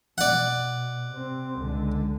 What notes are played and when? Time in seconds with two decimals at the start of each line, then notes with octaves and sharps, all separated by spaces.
0.18 B2 D5 F#5
1.10 C3 C4
1.57 C#2 D3